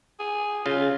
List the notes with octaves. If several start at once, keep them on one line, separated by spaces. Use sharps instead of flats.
G#4
C#3 F4